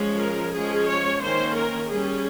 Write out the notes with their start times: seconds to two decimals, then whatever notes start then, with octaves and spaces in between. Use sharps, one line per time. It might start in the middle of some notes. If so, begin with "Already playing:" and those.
Already playing: F3 G#3 C#4
0.21 A#4
0.55 F3 G#3 C#4 G#4
0.88 C#5
1.22 D#3 A#3 C#4 C5
1.56 A#4
1.89 G3 C#4 G#4